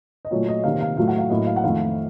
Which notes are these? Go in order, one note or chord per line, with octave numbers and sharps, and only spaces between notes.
D#5
A#2 F#3 A3 C#5
D#5
C3 D#3 A#3 F5
F5
A2 F#3 A3 F5
F#5
F5
A2 F#3 A#3 D#5
F5
F#5
F2 D#3 A3 F5